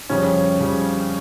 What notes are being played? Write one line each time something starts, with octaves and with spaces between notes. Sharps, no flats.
F2 C#3 G3 C#4
F2 C#3 G3